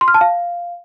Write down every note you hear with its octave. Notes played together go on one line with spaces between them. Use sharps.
C6
F6
A5
F5